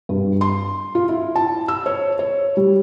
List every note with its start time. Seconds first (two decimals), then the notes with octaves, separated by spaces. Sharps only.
0.09 G2
0.41 C6
0.95 F4
1.09 E4
1.36 A5
1.68 E6
1.86 C#5
2.19 C#5
2.57 G3